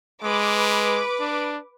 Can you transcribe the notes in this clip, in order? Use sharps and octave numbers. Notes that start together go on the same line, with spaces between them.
G#3 B4 D6
D4